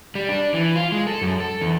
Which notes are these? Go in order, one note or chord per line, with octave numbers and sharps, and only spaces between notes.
G3
D4
E3
F4
G#3
A4
F#2
A4
E2